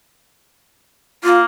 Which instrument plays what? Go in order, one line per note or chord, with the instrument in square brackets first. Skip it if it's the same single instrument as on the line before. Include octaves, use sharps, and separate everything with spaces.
[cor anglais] A#3 [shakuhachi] F4